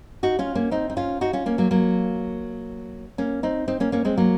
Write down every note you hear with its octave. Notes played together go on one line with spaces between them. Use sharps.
D#4 F#4
C#4 F4
A#3 C#4
C4 D#4
D#4
C#4 F4
D#4 F#4
C#4 F4
A#3 C#4
F#3 A#3
F#3 A#3
A#3 C#4
C4 D#4
C4 D#4
A#3 C#4
A#3 C#4
G#3 C4
F#3 A#3